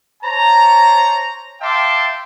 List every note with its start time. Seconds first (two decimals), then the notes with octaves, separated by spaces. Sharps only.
0.23 C5 C#5 A5 A#5
1.61 E5 F5 G5 A5 C6 D6